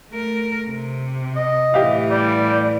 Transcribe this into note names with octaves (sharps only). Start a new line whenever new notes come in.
A3 A#4
C3
D#5
A2 E3 G4 E5 F5
G3 D5